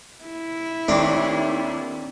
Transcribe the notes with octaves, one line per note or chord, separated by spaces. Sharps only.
E4
D#2 A3 C4 D4